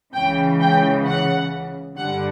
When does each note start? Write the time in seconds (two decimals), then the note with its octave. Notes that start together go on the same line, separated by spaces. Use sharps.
0.14 C#2 C#3 E3 G5
0.60 G5
1.06 F#5
1.97 G2 D3 G3 F#5